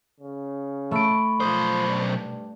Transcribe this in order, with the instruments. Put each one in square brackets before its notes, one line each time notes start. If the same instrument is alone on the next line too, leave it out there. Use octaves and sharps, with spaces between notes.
[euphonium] C#3
[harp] A3 D7 [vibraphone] B5 C#6
[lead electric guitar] B1 C5 [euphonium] F3 [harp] D#6
[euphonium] G2